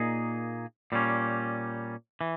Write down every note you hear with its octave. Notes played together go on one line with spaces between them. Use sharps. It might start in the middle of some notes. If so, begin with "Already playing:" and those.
Already playing: A#2 A#3 D#4 G#4
A#2 G3 C#4
E3